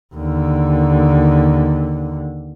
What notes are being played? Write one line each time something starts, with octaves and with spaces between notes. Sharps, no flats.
D#2 D3